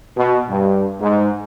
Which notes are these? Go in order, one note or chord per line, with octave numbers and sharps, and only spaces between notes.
B2
G2
G#2